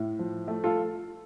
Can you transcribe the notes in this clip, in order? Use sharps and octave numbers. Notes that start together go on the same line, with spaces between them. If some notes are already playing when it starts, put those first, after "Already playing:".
Already playing: A2
F3
A3
F4 A4